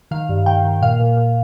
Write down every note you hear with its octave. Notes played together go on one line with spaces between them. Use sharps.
D#3 F5
G2
D#3 G5
D#3
A#2 F5
A#2
A#2